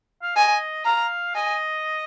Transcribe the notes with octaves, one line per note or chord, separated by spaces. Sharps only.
F5
D#5 G#5
F5 A#5
D#5 G#5